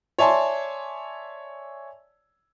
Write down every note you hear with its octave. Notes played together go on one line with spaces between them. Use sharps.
C#5 D5 E5 G#5 A5 C6